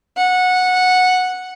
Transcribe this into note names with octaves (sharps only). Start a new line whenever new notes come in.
F#5